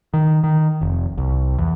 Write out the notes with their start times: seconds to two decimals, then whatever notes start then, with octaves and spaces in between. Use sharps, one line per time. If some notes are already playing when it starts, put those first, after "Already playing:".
0.14 D#3
0.44 D#3
0.81 F1
1.18 C2
1.58 E2